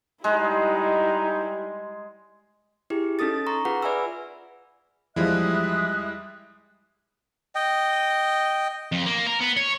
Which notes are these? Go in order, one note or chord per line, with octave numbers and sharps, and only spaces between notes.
G3 G#3 D#4 E4
E4 G4 G#4
C#4 D#4 A4 D#6 A6
A#5 C6 C#6
F4 G#4 B4 F#5
B4 D5 E5 G#5 B5 E6
E2 F3 G3 G#3 E4 E5 D#6 F#6
D#5 G5
F2
A#3
A#4
B3
C#5